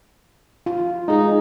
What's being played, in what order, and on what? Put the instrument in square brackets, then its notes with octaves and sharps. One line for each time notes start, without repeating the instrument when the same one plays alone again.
[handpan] F4
[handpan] G#3 G#4 [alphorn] D#4